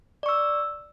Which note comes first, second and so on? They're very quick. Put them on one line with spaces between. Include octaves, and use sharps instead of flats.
D5 C#6 E6